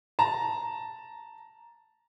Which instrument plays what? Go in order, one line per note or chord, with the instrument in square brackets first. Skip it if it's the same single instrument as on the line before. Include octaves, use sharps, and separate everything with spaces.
[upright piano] A5 A#5